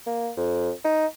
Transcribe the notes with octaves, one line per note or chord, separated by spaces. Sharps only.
A#3
F2
D#4